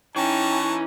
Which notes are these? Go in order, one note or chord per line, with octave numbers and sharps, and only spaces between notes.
E3 C#4 D#4 G5 A5 A#5 C#6